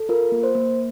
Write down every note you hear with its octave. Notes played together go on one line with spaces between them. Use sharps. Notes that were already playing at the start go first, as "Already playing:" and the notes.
Already playing: A4
F4 A#4
A#3
C5
A#3